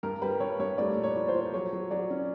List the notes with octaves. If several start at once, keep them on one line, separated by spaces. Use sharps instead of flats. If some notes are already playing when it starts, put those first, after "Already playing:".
G2 A#4
G3 B4
G2 C#5
G2 C#5
A3 D5
A#2
C#5
F3
C5
F3
F#3 C#5
F#3
F#3 D5
C#4